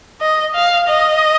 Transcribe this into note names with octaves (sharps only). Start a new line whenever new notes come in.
D#5
F5
D#5